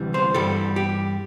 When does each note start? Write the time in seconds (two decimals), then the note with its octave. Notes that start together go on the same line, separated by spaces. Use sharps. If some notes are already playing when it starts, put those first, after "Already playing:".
Already playing: D2 C3 E3 G3
0.14 C5
0.34 G2 E3 G3 A4
0.76 G4